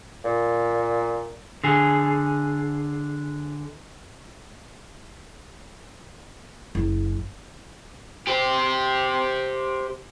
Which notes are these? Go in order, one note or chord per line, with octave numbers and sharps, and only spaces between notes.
A#2
D3 G#4
F#1
G4 C5